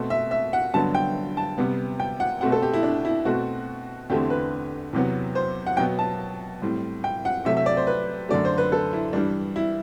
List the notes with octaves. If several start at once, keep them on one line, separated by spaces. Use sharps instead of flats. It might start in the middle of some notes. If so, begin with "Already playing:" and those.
Already playing: B2 A3 C4
E5
E5
F#5
G2 D3 F#3 B3 A5
G5
A5
C3 G3 B3
G5
F#5
B2 A3 C4 F#5
A4
G4
E4
D4
E4
B2 A3 C4 F#4
E2 D3 A3 C4 G4
B4
E2 C3 F#3 B3
C5
F#5
B2 F#3 B3 G5
A5
A2 G3 C4
G5
F#5
C3 F#3 A3 E5
E5
D5
C5
B4
F#2 D3 A3 D5
C5
B4
A4
E4
G2 E3 G3 D4
E4